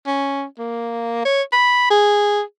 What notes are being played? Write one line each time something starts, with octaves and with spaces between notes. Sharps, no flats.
C#4
A#3
C#5
B5
G#4